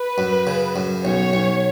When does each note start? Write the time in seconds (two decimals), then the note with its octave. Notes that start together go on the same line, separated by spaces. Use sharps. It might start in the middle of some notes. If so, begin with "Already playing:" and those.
Already playing: B4
0.18 F#2
0.47 C#3
0.76 F#2
1.04 B1 C#5
1.33 B1